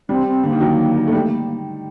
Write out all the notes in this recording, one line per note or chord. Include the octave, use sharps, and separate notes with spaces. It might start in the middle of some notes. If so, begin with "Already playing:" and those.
G3 C4
C4
D3 A#3
D#3
F#3
A3
G3